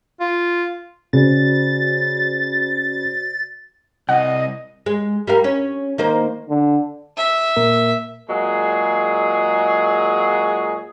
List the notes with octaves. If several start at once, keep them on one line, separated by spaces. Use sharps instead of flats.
F4
C#3 F#4 C5 D5 A6
C2 D#5 F#5
G#3
G3 A#4 F5
C#4
D#3 A#3 C5
D3
E5
A#2 A#3 A#4
A#2 F#3 G#3 G#4